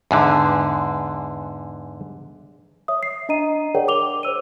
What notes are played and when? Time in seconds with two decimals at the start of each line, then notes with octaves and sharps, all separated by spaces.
0.11 E2 G#2 D3
2.88 C#5 E5 D#6
3.03 C7
3.29 D4 D#5 A#5 D#7
3.75 G#4 A#4 C#5 D5 F#5 G5
3.88 D6 F7 G7
4.23 C5 C#5 E6 D#7